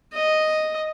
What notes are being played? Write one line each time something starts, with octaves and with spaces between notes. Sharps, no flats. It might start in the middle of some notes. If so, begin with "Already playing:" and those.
D#5